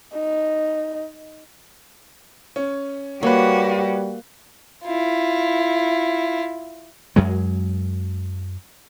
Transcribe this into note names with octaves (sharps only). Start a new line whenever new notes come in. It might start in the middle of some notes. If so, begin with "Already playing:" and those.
D#4
C#4
G3 A#3 F#4 G4 B4 C#5
E4 F4
F#2 F#3 G#3